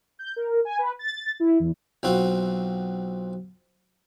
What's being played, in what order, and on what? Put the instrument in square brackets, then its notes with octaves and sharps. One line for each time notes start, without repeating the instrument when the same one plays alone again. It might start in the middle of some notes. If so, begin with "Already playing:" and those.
[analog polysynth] G6
A#4
G#5
B4
A6
E4
E2
[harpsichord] B1 C4 F4 F#4